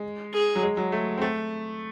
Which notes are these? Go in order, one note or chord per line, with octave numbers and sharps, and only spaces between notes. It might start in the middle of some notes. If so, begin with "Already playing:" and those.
Already playing: G#3
G#4
F#3
G#3
F#3
A3
C4
A3